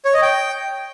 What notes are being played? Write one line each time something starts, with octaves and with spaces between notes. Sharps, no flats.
C#5
D#5
G5